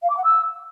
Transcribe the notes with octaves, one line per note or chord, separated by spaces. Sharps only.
F5
D6
F#5
E6